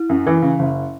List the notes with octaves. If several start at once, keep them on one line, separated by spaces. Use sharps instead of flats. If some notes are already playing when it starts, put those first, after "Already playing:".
Already playing: E4
F#2
E3
C#3
F#1